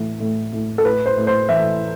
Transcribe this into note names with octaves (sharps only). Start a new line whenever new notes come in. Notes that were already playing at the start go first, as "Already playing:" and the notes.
Already playing: A2 E3
A2
A2
A4
A2 B4
C5
A2
C5
E3 E5